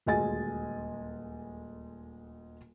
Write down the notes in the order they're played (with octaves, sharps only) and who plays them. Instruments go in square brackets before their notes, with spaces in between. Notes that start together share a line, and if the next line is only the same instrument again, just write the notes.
[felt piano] D#1 D2 G#3 D#5 G#5 A6